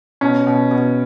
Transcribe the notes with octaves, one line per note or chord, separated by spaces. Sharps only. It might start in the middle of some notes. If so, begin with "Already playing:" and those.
B2 C#4
B2
B2